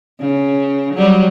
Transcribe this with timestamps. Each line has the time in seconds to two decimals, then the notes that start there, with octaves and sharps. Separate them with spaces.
0.20 C#3
0.94 F#3 G3